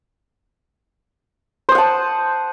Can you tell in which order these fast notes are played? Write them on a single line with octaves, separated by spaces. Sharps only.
C5 D#6 F#5 A5